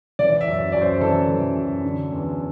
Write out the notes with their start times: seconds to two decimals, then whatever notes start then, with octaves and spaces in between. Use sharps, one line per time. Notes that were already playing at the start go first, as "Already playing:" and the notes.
0.19 E3 D5
0.41 E5
0.48 F#2
0.72 F#2 D5
0.82 C5
1.01 E3 A4
1.29 E3
1.56 F#2
1.84 D3
2.12 E2